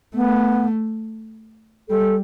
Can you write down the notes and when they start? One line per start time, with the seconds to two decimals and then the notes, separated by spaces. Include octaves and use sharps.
0.15 A3 B3
1.89 G3 A4